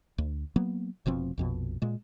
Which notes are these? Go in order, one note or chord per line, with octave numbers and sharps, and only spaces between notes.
D2
F#3 A#3 B3
F1 B2 F3 C4
A#1 F2 B2
A#2 G#3